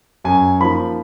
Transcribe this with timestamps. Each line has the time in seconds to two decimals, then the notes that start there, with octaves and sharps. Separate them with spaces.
0.24 F#2 G#5
0.60 F3 A#3 D#4 B5